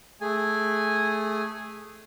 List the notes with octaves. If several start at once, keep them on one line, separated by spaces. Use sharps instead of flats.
A3 G#4 G#5